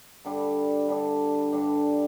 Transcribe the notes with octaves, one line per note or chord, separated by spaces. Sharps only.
G2 D3 G3 D4
G2 D3 G3 D4
G2 D3 G3 D4